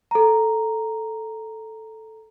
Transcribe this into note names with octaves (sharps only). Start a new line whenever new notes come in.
A4 A#5